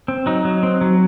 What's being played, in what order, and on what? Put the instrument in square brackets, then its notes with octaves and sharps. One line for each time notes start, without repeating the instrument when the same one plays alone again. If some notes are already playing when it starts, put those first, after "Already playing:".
[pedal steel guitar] C4
F#3 D#4
F#3
C4
F#3